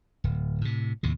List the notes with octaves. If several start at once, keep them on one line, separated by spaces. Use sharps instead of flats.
D1
A2 C3
D#2 A2 C3